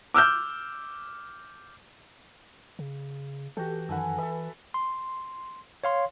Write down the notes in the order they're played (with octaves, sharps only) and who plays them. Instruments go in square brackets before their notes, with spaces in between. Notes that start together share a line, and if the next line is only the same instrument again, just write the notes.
[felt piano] D6 E6 F6 G6
[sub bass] C#3
[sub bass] E3 [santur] F#4 G5 [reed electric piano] G4 A4
[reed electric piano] F#2 D#3 F#5 [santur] A4 G#5 B5
[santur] A4 E5 [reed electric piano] B4
[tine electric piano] C6
C#5 F5 C6